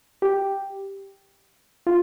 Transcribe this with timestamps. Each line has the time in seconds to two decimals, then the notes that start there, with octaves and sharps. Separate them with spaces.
0.22 G4
1.87 F4